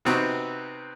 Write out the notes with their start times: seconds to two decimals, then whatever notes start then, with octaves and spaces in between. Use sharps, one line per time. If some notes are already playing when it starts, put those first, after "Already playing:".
0.05 C3 B3 C4 D#4 F#4